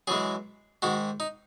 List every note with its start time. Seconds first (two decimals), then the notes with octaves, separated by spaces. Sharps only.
0.07 F#2 E3 G#3 G#4
0.82 G#2 D#3 G#3 F#4
1.20 D#4